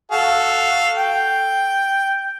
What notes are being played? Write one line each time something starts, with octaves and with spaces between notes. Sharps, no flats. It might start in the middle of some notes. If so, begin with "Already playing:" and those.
F#4 A4 F5
G5